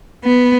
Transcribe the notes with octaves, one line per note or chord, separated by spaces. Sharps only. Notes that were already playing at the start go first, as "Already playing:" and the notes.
B3